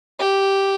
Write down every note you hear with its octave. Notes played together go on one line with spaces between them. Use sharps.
G4